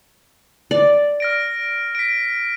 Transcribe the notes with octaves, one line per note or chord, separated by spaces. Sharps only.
D5
F6 A#6 D7
B6 D7